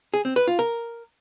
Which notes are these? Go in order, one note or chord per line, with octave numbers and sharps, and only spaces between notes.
G#4
C4
B4
F4
A#4